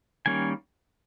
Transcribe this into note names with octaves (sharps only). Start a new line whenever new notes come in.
D#3 G3 A#3 C#4 G#5